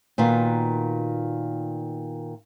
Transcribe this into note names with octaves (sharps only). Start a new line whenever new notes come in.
A#2 D#3 B3 F4 F#4